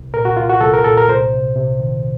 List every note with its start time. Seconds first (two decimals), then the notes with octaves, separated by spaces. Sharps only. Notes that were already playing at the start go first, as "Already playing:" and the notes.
Already playing: C2
0.14 A#2 A#4
0.25 F#4
0.37 C2 F4
0.49 F#4
0.61 C2 A4
0.74 A#4
0.84 A#2 A4
0.97 A#4
1.08 C2 C5
1.33 C3
1.56 C3
1.80 D#3